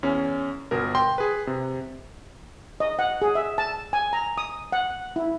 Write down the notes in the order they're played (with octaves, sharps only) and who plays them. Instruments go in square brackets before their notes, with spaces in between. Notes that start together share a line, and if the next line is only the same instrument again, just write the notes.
[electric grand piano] E2 C#4
G1 B2 A#4
G5 C6
G#4 B4
C3
[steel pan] D#5
F#5
G#4
E5
A5
G#5
A#5
D#6
F#5
E4